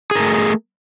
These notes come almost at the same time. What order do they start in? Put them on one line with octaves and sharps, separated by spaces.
G#4 A#4 A3